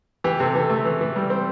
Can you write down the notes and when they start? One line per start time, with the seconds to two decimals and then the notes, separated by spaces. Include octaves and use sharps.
0.24 E3 G4
0.40 C3 A4
0.55 E3 A4
0.70 A3
0.85 E3
1.01 E3
1.16 G3
1.30 C4